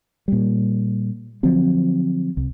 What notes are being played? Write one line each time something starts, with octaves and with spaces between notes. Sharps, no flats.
A#2 G3
D3 F3 F#3 C4
C2